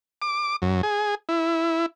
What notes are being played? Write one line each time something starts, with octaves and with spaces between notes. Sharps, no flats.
D6
F#2
G#4
E4